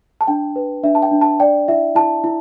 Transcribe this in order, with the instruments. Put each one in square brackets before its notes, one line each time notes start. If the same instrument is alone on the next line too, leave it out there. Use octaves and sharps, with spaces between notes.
[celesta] A5
D4 G5
B4
D4 E5
A5
G5
D4
A5
D5 G5
E4 E5
E4 A5
E4